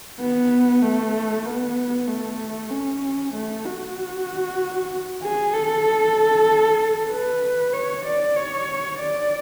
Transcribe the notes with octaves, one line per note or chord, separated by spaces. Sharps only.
B3
A3
B3
A3
C#4
A3
F#4
G#4
A4
B4
C#5
D5
C#5
D5